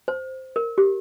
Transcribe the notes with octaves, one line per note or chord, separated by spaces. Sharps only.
C5
A#4
G4